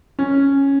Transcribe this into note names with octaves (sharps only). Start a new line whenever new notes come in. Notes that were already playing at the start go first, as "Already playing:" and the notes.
C#4